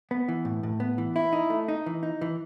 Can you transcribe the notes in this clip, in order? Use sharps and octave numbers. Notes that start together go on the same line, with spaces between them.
B3
E3
A2
A2
B3
E3
E4
D#4
A3
D#4
E3
D#4
E3